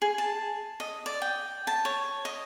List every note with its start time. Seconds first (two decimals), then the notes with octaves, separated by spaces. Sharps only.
0.02 G#4
0.18 A5
0.80 D#5
1.06 D5
1.22 G5
1.67 A5
1.85 C#5
2.25 D#5